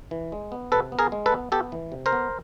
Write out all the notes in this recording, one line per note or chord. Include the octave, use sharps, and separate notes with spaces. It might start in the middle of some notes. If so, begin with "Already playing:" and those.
E3
G#3
B3
C3 A4 B4
B3
G#4 A#4
G#3
A4 B4
B3
B3 G4 A4
E3
C3
A#4 C5
B3